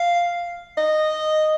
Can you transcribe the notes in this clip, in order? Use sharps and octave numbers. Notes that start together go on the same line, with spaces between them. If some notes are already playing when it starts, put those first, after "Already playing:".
Already playing: F5
D#5